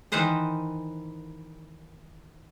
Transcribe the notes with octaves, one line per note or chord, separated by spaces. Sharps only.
D#3 E3 D#4 B4 C5 D#5